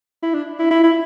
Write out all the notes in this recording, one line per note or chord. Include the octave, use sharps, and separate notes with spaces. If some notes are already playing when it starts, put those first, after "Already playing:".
E4
D4
E4
E4
E4